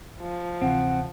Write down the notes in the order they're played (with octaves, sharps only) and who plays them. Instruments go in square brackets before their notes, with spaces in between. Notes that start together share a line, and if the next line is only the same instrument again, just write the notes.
[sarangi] F3
[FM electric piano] D2 C3 E3 [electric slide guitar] C4 [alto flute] F#5